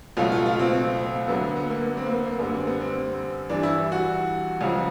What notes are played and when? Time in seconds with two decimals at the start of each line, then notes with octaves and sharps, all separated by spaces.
0.17 C#2 B2 F#3 A3 F4
0.32 F4
0.46 F4
0.59 C4
0.73 C4
1.28 D2 D3 F#3 B3
1.56 B3
1.70 A#3
1.84 B3
1.97 C4
2.06 A#3
2.12 B3
2.26 A#3
2.38 F#2 D3 G3 B3
2.53 C4
2.67 B3
2.81 C4
3.50 G2 E3 G3 D4
3.63 E4
3.92 F#4
4.61 C#2 C#3 F3